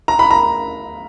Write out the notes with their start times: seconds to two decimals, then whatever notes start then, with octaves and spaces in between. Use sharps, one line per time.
0.08 A#5
0.19 B5
0.31 A#5